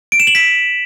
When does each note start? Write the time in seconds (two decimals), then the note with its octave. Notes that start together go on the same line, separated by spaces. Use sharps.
0.12 D7
0.20 E7
0.27 F#7
0.35 B6